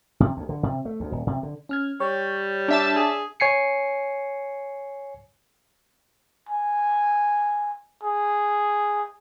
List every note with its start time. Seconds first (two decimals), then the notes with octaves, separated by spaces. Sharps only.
0.20 C3
0.37 D2
0.49 D3
0.63 C3
0.85 A3
1.00 D2
1.12 D#1
1.27 C3
1.43 D3
1.69 C#4 F6 G#6
2.00 G3 C#5
2.68 D4 E5 A5
2.96 G#4
3.40 C#5 G#5 C7 C#7
6.49 G#5
8.03 G#4